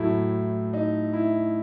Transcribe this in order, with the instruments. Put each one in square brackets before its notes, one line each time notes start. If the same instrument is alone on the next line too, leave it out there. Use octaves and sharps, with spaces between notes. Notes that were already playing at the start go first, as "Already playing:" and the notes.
Already playing: [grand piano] A2 F#3 A3 E4
D#4
E4